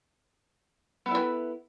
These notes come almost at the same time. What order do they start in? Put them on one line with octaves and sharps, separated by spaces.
B3 A4 E4 D4 B4